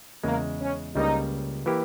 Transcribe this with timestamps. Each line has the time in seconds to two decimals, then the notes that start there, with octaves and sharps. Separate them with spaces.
0.24 E2 C#3 G#3 A#3
0.60 C#4
0.95 C#2 C#3 G3 A#3 D#4
1.66 E3 A#3 E4 G4